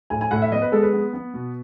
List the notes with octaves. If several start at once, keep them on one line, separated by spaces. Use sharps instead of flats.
A2 G#5
G#5
A2 F#5
E5
B3 D#5
B4
G#3 A4
B4
B3
B3
B2